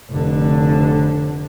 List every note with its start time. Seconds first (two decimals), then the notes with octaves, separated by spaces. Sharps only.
0.11 F1 D3